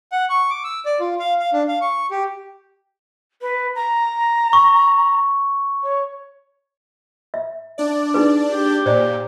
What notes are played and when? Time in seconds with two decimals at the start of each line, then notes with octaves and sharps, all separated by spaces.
0.12 F#5
0.30 C#6
0.50 D6
0.64 E6
0.85 D5
1.00 F4
1.19 F5
1.39 F5
1.53 D4
1.68 F5
1.81 C#6
2.11 G4
3.42 B4
3.75 A#5
4.53 C#6
5.83 C#5
7.34 E5
7.78 D4 D5
8.14 D#4 G#4 B4
8.51 G4
8.86 A#2 C5 D5